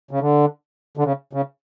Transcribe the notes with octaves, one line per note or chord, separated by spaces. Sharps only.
C#3
D3
D3
C#3
C#3